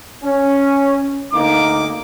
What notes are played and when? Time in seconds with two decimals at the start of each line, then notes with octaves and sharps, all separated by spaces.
0.23 C#4
1.33 D2 A#3 D#4 D6